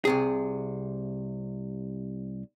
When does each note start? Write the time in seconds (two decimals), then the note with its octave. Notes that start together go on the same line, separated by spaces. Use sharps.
0.05 C2 C3 G#4